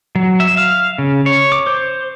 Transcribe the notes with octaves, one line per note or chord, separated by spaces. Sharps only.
F#3
E5
F5
C#3
C#5
D6
C5